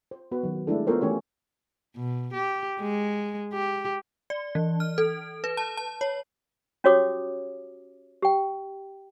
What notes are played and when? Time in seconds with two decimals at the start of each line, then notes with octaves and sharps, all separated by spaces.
0.11 C5
0.32 B3 F#4 B4
0.43 D#3 F#3
0.67 G#3 A3 D4 E4 A4
0.87 B3 F4 A4 A#4 C5 C#5
1.01 E3 A3 C#4 G4 C#5
1.96 B2
2.33 G4
2.80 G#3
3.53 G4
4.30 D5
4.55 E3
4.80 F6
4.98 A4
5.44 B4
5.57 A5
5.77 A5
6.01 C#5
6.84 C#4 F#4 G4 C#5 D6 D#6
8.22 G4 G5